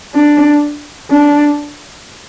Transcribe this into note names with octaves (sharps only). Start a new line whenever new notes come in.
D4
D4